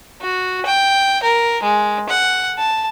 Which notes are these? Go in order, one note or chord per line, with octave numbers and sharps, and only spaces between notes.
F#4
G5
A#4
G#3
F#5
A5